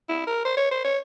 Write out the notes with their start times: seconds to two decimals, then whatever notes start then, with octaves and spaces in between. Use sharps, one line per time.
0.09 E4
0.27 A#4
0.45 C5
0.57 C#5
0.71 C5
0.84 C#5